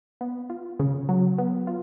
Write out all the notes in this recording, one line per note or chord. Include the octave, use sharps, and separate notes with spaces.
B3
F4
C#3
F#3
B3
F4